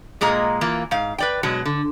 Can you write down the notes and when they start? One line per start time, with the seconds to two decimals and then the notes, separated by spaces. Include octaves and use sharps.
0.21 A#2 G#3 A#3 D#5 A#5
0.61 E3 A#3 F4
0.91 G#2 F5
1.18 B4 D5 G5
1.43 B2 F#3 G#3 F#4
1.65 D3